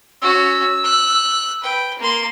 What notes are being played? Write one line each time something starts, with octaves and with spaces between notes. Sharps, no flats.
C#4 F#4 E6
F#6
B4 G5
A#3 C6